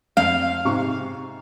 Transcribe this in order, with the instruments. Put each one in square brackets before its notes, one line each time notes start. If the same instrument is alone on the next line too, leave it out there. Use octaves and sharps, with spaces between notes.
[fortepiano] F2 [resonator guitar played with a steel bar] F5
[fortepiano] G#2 C3 C#6